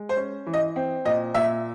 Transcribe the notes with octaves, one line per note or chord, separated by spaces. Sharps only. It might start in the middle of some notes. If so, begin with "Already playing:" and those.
Already playing: G#3
C5
C#4
E3
D#5
C4
A#2 D#5
A#2 E5